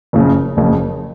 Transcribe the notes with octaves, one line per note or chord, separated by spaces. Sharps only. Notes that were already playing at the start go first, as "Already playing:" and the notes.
F#1 F2 C#3
F#1 F2 C#3